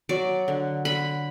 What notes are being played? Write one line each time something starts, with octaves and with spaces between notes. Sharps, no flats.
F#3 D5
D3
D3 B5